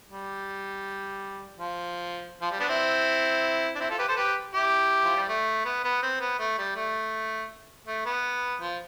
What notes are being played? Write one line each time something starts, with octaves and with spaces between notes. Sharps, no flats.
G3
F3
F3
G3
B3 D4
C4 E4
D4
C4 E4
F4 A4
G4 B4
A4 C5
G4 B4
E4 G4
F3
G3
A3
B3
B3
C4
B3
A3
G3
A3
A3
B3
F3